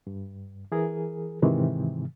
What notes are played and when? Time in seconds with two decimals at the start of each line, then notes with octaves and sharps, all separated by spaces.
0.07 G2
0.72 E3 G#4 A#4
1.42 G#2 C3 D#3 E3 G#3